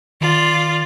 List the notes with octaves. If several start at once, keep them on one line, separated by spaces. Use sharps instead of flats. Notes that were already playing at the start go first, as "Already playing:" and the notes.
D#3 F4 D5